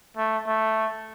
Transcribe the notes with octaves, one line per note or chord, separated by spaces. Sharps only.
A3
A3